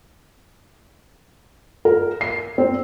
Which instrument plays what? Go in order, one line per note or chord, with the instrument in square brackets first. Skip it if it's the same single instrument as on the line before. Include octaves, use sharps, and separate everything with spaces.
[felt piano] A#4
C7
C4